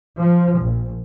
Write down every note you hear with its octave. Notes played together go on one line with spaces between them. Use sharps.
F3
A#1